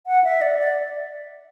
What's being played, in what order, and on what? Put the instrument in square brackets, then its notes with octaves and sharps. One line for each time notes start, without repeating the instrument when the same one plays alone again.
[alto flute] F#5
E5
D5
D5